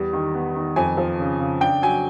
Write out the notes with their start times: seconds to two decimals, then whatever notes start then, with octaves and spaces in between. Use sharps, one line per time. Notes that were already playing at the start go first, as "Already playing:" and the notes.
Already playing: E2 G3
0.13 D#3
0.35 B3
0.55 D#3
0.76 F2 G#5
0.97 F3
1.19 C#3
1.39 C#3
1.61 D4 G5
1.82 F#3 G#5